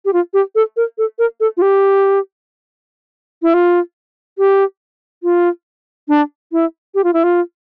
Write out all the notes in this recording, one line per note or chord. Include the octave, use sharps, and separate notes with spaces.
G4
F4
G4
A4
A#4
A4
A#4
A4
F4
G4
E4
F4
G4
F4
D4
E4
G4
F4
E4
F4